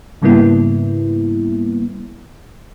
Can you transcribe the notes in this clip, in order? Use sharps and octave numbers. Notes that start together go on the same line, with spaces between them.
G#2 C#3 G3 A#3 B3 E4